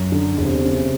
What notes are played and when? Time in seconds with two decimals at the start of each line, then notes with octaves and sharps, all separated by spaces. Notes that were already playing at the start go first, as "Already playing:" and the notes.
Already playing: F#2
0.12 D3
0.37 E2 C3
0.63 C#3